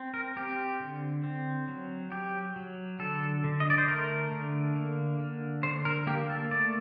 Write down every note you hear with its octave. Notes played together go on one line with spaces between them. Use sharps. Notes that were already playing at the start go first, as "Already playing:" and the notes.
Already playing: C4
A#4
C4 G4
D3
C4
F#3
F#3 G4
F#3
D3 A4
D3
D#5
D5
C5
A3 A#4
D3
A#3
D3
D3 C5
A#4
A#3 G4
A4
A3 D5